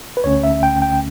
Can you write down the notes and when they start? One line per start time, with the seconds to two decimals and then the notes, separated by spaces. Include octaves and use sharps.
0.17 B4
0.24 D2 D3 A3 C#4 C#5
0.43 E5
0.63 G5
0.82 G5